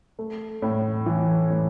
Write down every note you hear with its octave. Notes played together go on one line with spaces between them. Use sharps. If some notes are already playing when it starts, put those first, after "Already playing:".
A3
A2
E3
A2